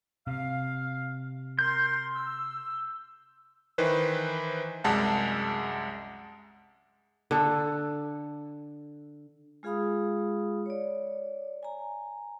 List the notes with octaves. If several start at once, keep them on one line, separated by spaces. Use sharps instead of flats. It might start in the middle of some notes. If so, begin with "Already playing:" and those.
C3 F5
A#4 C6 G6
E6
D#3 E3 B4 C5
C2 F#2 G#3 F#5 A5 F#6
D3 A4
G#3 F4 G#4 F5 B5 D#6
C#5 D5
G#5 A#5